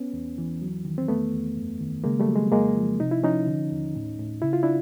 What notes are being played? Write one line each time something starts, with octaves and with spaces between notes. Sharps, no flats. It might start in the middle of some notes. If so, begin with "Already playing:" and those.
Already playing: B3 C#4
E2
E3
F#3
D#3
C4
E2 A3 B3
E2
F#2
D#3
C#3 G#3 A#3
G3 A3
F#3
G#3
F2 G#3 A#3
F3
C3 D#4
E4
F3 C#4 D#4
D3
D#2
A2
A2
C#3 E4
F4
D4 E4